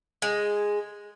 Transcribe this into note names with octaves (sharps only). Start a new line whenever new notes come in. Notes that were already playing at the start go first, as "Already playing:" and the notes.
G#3